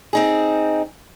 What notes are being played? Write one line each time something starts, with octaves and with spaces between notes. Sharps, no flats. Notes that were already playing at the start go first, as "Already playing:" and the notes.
C4 D#4 G#4